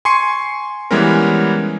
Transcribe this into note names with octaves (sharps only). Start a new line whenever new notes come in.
G#5 C6 C#6 C7 C#7
E3 G3 G#3 B3 C#4 A#4